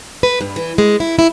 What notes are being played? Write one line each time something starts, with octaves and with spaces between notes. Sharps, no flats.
B4
G2
E3
G#3
E4
E4